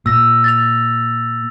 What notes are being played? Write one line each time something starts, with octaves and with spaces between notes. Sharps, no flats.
A#2 E6 A#6
A6 A#6 F7